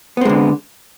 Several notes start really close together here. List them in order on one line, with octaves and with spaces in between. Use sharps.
B3 C4 G#3 D3